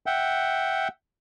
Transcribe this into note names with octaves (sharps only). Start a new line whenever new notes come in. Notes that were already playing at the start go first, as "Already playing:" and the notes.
E5 F#5 G5